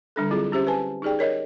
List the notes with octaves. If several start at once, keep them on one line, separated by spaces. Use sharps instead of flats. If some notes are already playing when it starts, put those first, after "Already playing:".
D3 G3 D4 A4
F#3 C4 E4 F4 G#4
C#4 G4 C5 E5
B4 G#5 A5
D#4 G4 G#4 D5 G5
A#4 C#5 D#5